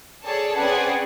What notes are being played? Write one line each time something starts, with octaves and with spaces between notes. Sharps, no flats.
G#4 A4 C#5 D5 A5
C4 C#4 G#4 B4 D5 F#5